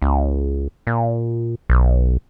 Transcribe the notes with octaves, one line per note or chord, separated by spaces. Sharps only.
C#2
A#2
B1